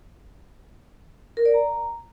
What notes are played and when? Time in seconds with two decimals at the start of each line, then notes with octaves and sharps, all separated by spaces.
1.37 A#4
1.45 D5
1.54 A#5